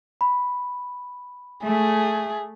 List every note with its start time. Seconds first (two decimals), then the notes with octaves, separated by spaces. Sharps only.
0.21 B5
1.64 A3 G#4